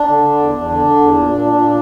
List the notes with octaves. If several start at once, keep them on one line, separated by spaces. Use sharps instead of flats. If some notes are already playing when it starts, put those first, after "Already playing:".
Already playing: D4
D3
D3
E2
E2
D3
D3
E2
A#2
A#2
A#2
A#2